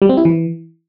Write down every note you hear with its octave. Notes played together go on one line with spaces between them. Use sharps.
G3
C4
E4
E3